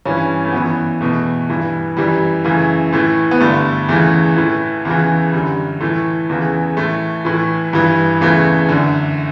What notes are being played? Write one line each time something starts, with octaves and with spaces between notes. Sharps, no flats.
G2 E3 C#4
A3
F#2 E3 B3
E2 B2 A3
G2 E3
F#2 E3 G3
F#2 C#3 E3 A3
A2 E3 A3
B3
G2 D3 A3
E2 C#3 E3 A3
A2 E3
E2 C#3 E3
F#2 D3 G3
A2 E3 A3
E2 C#3 E3
A2 E3 A3
A2 E3
G2 E3
E2 C#3 E3 A3
F#2 D3